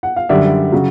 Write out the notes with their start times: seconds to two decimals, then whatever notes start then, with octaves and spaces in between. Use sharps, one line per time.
0.03 F#5
0.16 F5
0.29 F#2 D3 G3 D5 E5
0.72 C#3 F#3